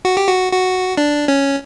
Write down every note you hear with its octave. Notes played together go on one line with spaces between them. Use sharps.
F#4
G4
F#4
F#4
D4
C#4